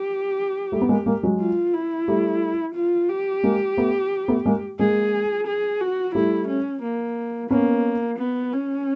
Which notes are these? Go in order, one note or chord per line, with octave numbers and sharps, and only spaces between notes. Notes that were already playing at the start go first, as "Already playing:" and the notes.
Already playing: G4
G3 A3
B3
G#3 A#3
G#3 A#3
F#3 G#3
F4
E4
G3 A3
F4
G4
G#3 A#3
A3 B3
A3 B3
G#3 A#3
G#3 A#3 G#4
G#4
F#4
G3 A3 E4
C#4
A#3
A#3 B3 C#4
B3
C#4